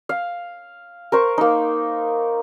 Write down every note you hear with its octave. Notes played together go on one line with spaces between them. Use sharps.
F5
A#4 C5 C#6
A#3 D#4